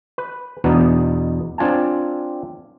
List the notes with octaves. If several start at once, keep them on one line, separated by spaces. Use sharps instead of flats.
B4
E2 B2 B3 D4 D#4
C4 D4 F4 G#5 A5